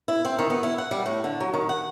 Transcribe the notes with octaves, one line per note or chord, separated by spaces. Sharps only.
E4
C4
D#3
B3
E4
F#5
G3
A2
D3
F#3
D#3
F#5